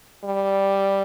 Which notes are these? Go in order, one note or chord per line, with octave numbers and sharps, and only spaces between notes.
G3